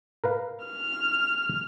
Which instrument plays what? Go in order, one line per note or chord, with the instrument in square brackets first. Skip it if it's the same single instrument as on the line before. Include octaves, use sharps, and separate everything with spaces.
[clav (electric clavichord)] A#4 B4 F5
[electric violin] F6